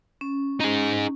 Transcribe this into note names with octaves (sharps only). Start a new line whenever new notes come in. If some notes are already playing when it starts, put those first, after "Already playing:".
C#4
D#4 G#4